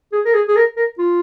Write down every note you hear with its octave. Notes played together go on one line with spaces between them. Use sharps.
G#4
A#4
G#4
G#4
A#4
A#4
F4